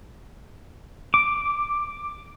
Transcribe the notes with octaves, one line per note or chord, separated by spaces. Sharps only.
D6